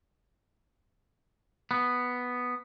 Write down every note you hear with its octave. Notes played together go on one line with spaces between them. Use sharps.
B3